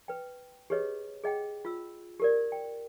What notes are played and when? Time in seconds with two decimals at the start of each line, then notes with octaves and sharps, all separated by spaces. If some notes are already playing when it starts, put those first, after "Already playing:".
0.08 B4 G5
0.70 G4 G#4 B4 C#5 D#5
1.24 G#4 D#5 F#5 G5
1.65 F4 E6
2.20 G4 A#4 D5
2.52 G5